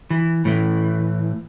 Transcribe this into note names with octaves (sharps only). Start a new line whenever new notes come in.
E3
A2 E3